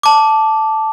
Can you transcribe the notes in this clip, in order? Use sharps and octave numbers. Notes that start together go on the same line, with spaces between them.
A5 D6